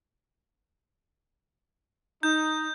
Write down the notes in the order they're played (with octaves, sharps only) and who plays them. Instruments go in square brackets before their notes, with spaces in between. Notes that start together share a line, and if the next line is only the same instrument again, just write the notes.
[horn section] D#4 [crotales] G6